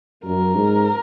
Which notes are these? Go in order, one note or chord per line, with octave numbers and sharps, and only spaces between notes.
F#2 A#4
G#2